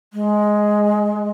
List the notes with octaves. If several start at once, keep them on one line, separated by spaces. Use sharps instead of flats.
G#3